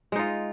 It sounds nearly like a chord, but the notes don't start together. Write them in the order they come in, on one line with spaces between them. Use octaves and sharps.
G#3 D#4 F4